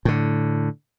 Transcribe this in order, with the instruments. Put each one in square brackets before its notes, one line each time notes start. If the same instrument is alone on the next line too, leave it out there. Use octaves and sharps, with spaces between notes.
[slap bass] A2 D3